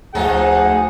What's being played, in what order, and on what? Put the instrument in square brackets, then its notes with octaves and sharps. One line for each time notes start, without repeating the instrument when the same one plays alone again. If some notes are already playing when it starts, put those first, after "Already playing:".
[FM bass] D2 [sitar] F3 D#4 A4 [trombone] G#4 [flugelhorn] F#5